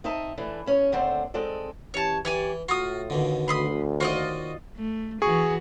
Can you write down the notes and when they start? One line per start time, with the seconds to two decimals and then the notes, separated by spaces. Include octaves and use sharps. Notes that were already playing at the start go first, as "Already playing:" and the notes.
0.04 C4 D#4 D#5 E5 A5
0.38 E3 A3 D4
0.66 E2 C#4 C#5
0.92 D#2 D3 A3 C4 D4 C5
1.34 G#3 C4 D#4 A4 D5
1.94 E3 C#4 G4 C#5 A5
2.25 E3 G4 C#5 D5 G#5
2.69 A2 F4 F#4 D#6
3.10 D#2 B2 D3
3.48 D2 B5 C6 D#6
4.00 D#2 F4 F#4 C5 D5 D#5
4.76 A3
5.22 E3 F#4 G#4 C#6